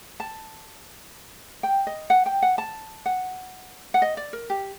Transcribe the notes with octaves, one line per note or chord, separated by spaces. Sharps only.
A5
G5
D#5
F#5
G5
F#5
A5
F#5
F#5
D#5
D5
A#4
G4